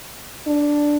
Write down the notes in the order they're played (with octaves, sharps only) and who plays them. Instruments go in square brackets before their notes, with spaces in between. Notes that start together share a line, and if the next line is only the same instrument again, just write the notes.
[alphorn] D4